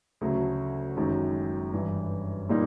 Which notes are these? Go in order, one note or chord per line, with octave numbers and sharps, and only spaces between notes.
D2 C#3 F#3 A3
F#1 F#2 D#3 G#3
G2 E3 G3
A#2 G3 A#3 D#4